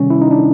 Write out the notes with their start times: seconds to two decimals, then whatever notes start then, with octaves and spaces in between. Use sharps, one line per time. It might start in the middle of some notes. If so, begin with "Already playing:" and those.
Already playing: C3 D#3 G3 C#4
0.10 E4
0.22 D#4
0.31 D4